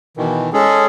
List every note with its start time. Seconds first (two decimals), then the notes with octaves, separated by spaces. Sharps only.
0.17 B2 D#3 E3
0.53 G#3 C#4 G#4 A4